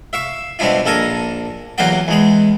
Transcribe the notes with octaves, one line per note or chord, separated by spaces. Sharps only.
E5 F5 C#6
B2 G3 C4 D4 E4 F4
A#1 A4 A#4 G#5 A#5
E2 F#3 A#3 F4 F#4 G5
E2 G#3 B5